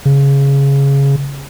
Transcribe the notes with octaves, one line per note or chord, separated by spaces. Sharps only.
C#3